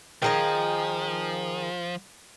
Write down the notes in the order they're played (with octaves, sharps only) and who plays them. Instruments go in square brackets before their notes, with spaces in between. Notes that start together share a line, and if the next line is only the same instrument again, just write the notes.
[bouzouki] D#3 G#4 D#5 [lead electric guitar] F3 [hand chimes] G5 A#5